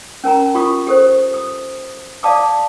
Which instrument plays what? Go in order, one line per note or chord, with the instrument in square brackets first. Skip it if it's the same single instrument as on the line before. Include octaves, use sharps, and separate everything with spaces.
[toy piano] C#4 A#4 G#5 A#5
F4 G4 C#6 D#6
G4 A4 C5
D#6
D5 F5 A5 D6 D#6